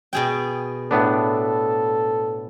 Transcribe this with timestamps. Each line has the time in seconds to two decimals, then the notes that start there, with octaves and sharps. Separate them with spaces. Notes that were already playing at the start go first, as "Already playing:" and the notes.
0.13 B2 G#4 G5
0.91 A2 B3 D4 A4